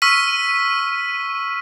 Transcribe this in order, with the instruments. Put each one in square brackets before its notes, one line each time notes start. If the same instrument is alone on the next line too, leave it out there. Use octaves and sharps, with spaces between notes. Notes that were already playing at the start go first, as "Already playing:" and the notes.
[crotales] C#6 E6 F6 B6 D#7